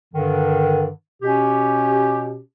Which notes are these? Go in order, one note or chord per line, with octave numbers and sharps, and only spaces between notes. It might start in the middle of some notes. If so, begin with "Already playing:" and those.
G2 D3 D#3
B2 C#4 G4